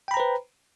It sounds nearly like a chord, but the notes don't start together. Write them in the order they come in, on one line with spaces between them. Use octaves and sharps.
G5 B5 A#5 C5 B4